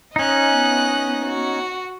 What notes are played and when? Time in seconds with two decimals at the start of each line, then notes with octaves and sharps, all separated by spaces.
0.16 C#4 D#4 D#5 F#6
0.52 B3
1.25 F#4